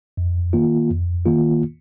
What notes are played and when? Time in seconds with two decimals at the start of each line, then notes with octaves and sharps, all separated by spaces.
0.17 F2
0.53 D#3 A#3 F4
0.90 F2
1.25 D#3 A#3 F4